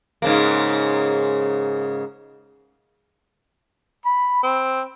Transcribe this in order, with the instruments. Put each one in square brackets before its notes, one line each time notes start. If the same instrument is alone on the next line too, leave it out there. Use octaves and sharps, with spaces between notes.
[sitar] G#2 C#3 A#3
[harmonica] B5
C4